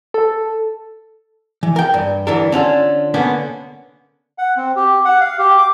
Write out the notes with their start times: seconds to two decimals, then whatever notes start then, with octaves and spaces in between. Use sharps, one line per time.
0.14 A4
1.63 E3
1.76 A#4 G5
1.94 G2
2.27 D2 E3 D4 A4 A#4
2.52 D3 C#4 F4 A4
3.14 D3 A#3 B3 C#4
4.38 F#5
4.57 C4
4.76 G4
5.05 F#5
5.20 F5
5.39 G4
5.58 D6